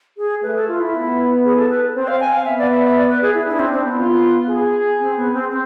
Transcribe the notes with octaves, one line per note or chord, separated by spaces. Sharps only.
G#4
A3 B4
A4
F4
E4
B3
G#4
A4
B4
C4 C5
F5
G#5
F5
B3 E5
D5
E5
E5
D5
B4
G#4
E4
D4 E4
C4
C4
B3
F4
G#4
C4
B3
C4
C4